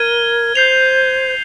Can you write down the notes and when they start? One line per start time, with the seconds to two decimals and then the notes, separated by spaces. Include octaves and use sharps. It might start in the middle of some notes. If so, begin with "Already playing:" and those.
Already playing: A#4 G#6 D#7 G7
0.55 C5 G6 C7 F7